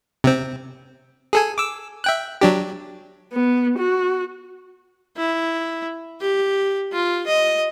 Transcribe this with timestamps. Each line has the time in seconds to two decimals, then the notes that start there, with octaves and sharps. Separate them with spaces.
0.24 C3 C4
1.33 G#4 A4 G#5
1.58 D6 E6
2.04 E5 G5 F#6
2.41 F#3 D4 G4
3.33 B3
3.79 F#4
5.17 E4
6.21 G4
6.92 F4
7.27 D#5